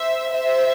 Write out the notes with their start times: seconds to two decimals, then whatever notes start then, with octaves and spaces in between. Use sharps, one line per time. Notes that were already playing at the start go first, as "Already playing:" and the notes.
Already playing: C5 E5
0.32 C5 E5